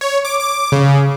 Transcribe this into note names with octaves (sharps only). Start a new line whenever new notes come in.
C#5
D6
D6
C#3